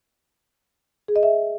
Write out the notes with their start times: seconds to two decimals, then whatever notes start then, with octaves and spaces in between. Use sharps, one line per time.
1.08 G#4
1.16 D#5
1.23 E5